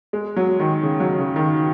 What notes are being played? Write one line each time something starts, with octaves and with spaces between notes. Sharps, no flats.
G#3
F#3
D#3
C#3
F#3
C#3
D#3